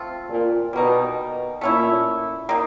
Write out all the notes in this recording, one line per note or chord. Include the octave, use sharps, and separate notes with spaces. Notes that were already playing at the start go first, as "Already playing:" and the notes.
Already playing: A3 C4 F4
A#2
B2 G3 A#3 D#4
A#2 A3 C#4 E4
A#3 D#4